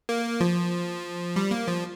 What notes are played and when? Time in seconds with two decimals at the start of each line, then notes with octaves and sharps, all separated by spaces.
0.09 A#3
0.40 F3
1.36 G3
1.51 A#3
1.68 F3